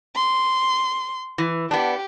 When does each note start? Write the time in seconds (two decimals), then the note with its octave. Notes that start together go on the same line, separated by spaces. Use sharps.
0.16 C6
1.38 E3
1.71 B3 D4 G4